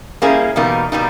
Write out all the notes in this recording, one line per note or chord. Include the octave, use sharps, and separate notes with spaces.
G3 A#3 C#4 E4 G#4
E2 B2 G3 A#3 D#4
B2 G3 A#3 D#4